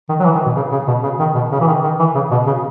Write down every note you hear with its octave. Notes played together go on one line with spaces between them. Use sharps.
D#3
F#3
E3
D#3
B2
C#3
C#3
B2
C#3
D#3
B2
C#3
E3
D#3
D#3
E3
C#3
B2
C#3